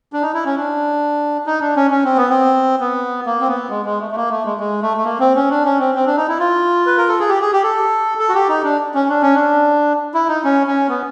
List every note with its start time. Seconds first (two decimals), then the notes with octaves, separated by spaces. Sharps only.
0.13 D4
0.22 D#4
0.34 E4
0.45 C#4
0.57 D4
1.46 D#4
1.61 D4
1.76 C#4
1.91 C#4
2.04 C4
2.17 B3
2.30 C4
2.80 B3
3.26 A#3
3.41 C4
3.48 B3
3.70 G#3
3.85 G#3
4.01 A3
4.11 A3
4.16 A#3
4.30 A3
4.45 G#3
4.60 G#3
4.82 A3
4.97 A3
5.05 A#3
5.20 C4
5.36 C#4
5.50 D4
5.65 C#4
5.79 C4
5.95 C4
6.06 D4
6.17 D#4
6.28 E4
6.39 F4
6.86 B4
6.98 A#4
7.08 A4
7.19 G#4
7.29 G4
7.41 G#4
7.53 G4
7.63 A4
8.19 A4
8.29 F#4
8.34 G4
8.49 D#4
8.64 D4
8.95 C#4
9.09 D4
9.22 C#4
9.35 D4
10.14 E4
10.28 D#4
10.44 C#4
10.67 C#4
10.88 B3